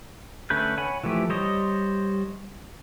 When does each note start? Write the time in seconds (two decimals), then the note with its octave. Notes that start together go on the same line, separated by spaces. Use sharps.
0.50 D3 A3 C#4 B4 G6
0.77 C#5 F#5 G#5 B5
1.04 E3 F3 A3 G4
1.30 G3 C5 C#5 D#5